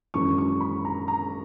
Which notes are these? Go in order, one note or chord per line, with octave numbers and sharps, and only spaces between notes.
G#1 F#2 E3 C#6
C#6
B5
A#5
A#5